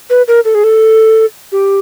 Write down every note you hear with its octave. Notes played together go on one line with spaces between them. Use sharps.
B4
A#4
A4
G#4
A4
G4